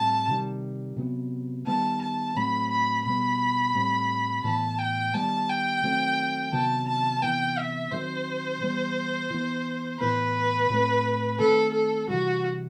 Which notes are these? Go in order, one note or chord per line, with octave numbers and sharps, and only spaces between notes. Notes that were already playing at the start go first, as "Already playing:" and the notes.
Already playing: A2 G3 C4 A5
C3 D#3 G3
C3 F#3 B3
D#3 G3 B3 A5
A5
A2 F#3 A3 C4 B5
B5
B2 G3 B3 B5
A2 G3 C4
A2 E3 B3 A5
G5
D#3 G3 B3 A5
G5
D#3 F#3 A3 C4
C3 D#3 F#3 B3 A5
A5
C3 E3 B3 G5
E5
D#3 F#3 A3 C4 C5
E3 G3 B3
E3 B3
A2 E3 B3 B4
A2 F#3 A3 C4
D#3 A3 C4 A4
A4
C3 E3 G3 F#4